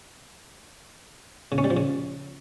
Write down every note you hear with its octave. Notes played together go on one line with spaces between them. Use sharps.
C#3
C#4
G3
F3
C#3